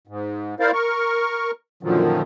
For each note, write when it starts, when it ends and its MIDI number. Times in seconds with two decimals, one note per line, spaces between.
0.07 0.55 44
0.60 0.71 64
0.60 0.71 70
0.60 0.71 72
0.60 0.71 74
0.60 0.71 77
0.73 1.51 70
0.73 1.51 85
1.83 2.22 42
1.83 2.22 46
1.83 2.22 50
1.83 2.22 51
1.83 2.22 53
1.83 2.22 54